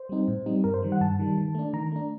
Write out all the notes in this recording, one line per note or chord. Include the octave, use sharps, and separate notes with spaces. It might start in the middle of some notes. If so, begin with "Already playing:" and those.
Already playing: C5
G3 C4 D#4
A2
G3 C4 D#4
G2 A#4
C5
D#3 G3
F#5
G2 A5
D#3 G3
D#3
A3 D4
D#3 A#5
A3 D4